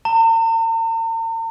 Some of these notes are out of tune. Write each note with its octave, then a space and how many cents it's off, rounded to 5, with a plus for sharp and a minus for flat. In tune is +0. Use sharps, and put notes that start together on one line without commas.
A#5 -45